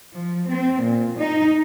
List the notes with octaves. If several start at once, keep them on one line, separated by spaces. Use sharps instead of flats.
F3
C4
A#2
D#4